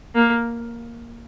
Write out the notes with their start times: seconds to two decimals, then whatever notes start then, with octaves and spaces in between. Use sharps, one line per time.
0.15 A#3